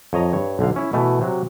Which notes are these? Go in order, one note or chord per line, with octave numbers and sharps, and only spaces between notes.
F2 C#5 D#5 A#5
G2 C#5
B1 D3 F5
C#4 E4
B2 E3 A3
C3 F#3